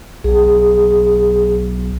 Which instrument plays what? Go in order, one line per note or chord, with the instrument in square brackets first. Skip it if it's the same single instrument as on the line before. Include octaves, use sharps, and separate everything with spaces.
[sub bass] B1 [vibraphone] G#4